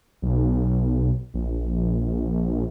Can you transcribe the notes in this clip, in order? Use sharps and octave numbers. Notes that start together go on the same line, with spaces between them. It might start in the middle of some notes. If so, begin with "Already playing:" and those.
B1
A#1